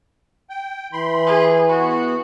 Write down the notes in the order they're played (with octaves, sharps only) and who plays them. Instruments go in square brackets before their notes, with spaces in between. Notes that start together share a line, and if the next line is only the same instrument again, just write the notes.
[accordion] G5
[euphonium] E3 [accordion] B5 C6
[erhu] G#4
[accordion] B3 [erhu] F#4